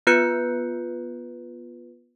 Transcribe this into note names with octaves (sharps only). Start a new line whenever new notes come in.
B3 F4 B4 F#6 G6 C#7